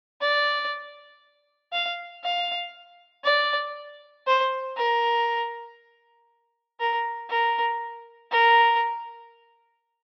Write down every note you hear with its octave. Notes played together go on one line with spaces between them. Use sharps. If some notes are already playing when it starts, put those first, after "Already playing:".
D5
F5
F5
D5
C5
A#4
A#4
A#4
A#4